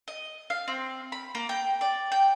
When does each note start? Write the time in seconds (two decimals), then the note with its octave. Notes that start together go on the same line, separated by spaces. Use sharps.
0.08 D#5
0.50 F5
0.68 C4
1.12 B5
1.35 A#3
1.49 G5
1.81 D5
2.12 G5